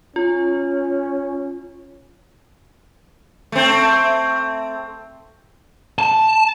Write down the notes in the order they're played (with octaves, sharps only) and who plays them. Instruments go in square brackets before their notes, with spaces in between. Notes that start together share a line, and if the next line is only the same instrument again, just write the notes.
[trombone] C#4 [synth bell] F4
[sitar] A3 C4
[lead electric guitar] A5